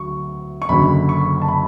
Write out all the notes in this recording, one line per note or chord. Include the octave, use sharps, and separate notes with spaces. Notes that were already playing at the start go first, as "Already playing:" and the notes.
Already playing: D2 D3 F#3 C#6
C#6
F#1 F#2 D3 B5
C#6
A5
B5